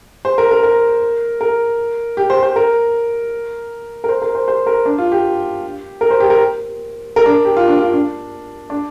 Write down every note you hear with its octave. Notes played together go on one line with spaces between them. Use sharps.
C5
A#4
A#4
A#4
A#4
G4
C5
C5
A#4
A#4
C5
A#4
C5
C5
A#4
D4
F4
G4
A#4
C5
G4
A#4
A#4
D4
G4
F4
D4
F4
D4
D4